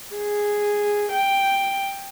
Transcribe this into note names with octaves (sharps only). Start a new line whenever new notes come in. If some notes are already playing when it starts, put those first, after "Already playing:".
G#4
G5